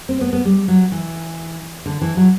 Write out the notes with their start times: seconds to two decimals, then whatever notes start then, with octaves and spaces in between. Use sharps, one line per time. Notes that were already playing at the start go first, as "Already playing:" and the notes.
0.09 C4
0.21 B3
0.33 B3
0.45 G3
0.68 F#3
0.92 E3
1.86 D3
2.02 E3
2.17 F#3